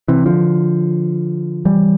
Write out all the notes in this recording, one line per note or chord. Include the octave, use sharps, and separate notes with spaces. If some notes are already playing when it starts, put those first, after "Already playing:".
C3 E3
D3 F3
E3 G3